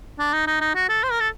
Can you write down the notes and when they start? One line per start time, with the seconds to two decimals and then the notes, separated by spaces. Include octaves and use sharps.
0.19 D4
0.33 D#4
0.47 D#4
0.61 D#4
0.75 F#4
0.89 A4
1.03 C5
1.11 A#4
1.20 A4